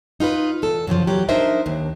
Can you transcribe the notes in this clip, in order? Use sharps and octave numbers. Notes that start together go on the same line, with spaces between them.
D#4 F4 G#4 B4
E2 A4
F#2 C#3 E3 F3
E2 F#3 G4
D4 D#4 A#4 C5 D#5 E5
D#2 D4